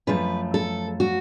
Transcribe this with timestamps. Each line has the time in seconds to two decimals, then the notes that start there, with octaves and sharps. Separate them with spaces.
0.07 F#2 F3 A3 B4
0.54 A4
1.00 F#4